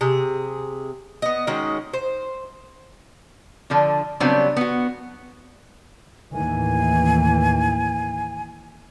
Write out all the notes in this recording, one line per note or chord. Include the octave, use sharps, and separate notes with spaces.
C3 G#4
B3 D#5
D#3 G#3 C#4 F#4
C5
D3 F3 D4
C#3 F#3 G3 B3 C4 D4
B3 F#4
D#2 A2 E3 G#5